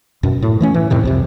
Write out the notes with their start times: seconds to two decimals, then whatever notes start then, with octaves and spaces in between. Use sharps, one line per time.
0.23 F#2 B2
0.42 A2
0.61 E3 A3 C#4
0.74 E3
0.90 F2 A2 C3 D#3
1.03 C2 F2 C3